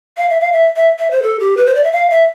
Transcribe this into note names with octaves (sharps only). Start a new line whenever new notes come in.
F5
E5
F5
E5
E5
E5
C5
A4
G4
B4
C5
D5
E5
F5
E5